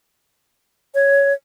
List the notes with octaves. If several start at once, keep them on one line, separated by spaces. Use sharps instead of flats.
C#5